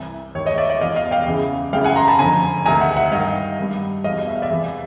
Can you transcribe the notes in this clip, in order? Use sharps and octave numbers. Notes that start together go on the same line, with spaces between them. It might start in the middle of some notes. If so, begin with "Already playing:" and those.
Already playing: C2 C3 E3
D#2 D#3 C#5
C#5 D#5
D5 E5
D5 E5
E2 B2 D#5 F5
D#5 F5
F5 G5
E2 C#3 E3
F#2 C#3 E3 F5 G5
F#5 G#5
A#5 C6
A5 B5
F2 D3 G#5 A#5
D2 C3 D#3 G#5 A#5
E5 F#5
E5 F#5
G2 D#3 D#5 F5
G2 D#3
E2 D#5 F5
B2
E5
F5
D5 E5
E2 C3 E3